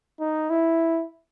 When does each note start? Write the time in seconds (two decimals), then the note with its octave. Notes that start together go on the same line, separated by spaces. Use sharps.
0.20 D#4
0.50 E4